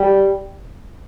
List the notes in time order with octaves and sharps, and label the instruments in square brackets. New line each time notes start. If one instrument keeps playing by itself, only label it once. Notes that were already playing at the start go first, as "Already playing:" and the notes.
Already playing: [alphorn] G3